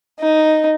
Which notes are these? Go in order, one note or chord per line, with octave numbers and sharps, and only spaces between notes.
D#4